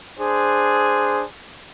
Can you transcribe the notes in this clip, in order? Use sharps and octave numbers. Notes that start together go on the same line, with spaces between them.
D4 G#4 C5